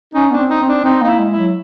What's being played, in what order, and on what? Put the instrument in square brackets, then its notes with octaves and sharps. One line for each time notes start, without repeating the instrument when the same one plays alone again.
[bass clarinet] C#4 [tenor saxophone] D#4
[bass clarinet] B3 [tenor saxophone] D4
[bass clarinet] C4
[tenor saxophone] D#4
[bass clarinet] C4
[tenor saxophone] D4
[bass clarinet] C4 [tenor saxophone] D#4
[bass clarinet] A#3 [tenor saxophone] D#4
[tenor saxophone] E4
[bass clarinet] G#3
[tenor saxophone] E4
[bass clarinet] F#3